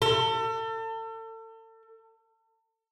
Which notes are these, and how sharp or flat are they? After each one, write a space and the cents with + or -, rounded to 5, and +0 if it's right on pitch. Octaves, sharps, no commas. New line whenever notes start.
A4 +35